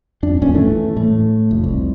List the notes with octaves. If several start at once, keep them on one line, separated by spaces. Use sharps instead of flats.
F2 D4
D1 G2 A#2 C#4
E3 A3
A2 A3
F1
C2